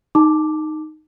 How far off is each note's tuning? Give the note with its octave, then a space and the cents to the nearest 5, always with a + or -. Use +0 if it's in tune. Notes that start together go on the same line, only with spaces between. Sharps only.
D#4 -5 A5 +0 D6 +0